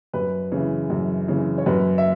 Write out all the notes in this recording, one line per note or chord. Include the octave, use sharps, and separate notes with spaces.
F#2 B4
C#3 E3
F#2
C#3 E3
C#5
F#2 B4
E5